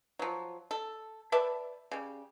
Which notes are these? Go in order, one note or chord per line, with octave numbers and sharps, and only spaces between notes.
F3 F#3
A4
B4 D5 E5 A5
C#3 G3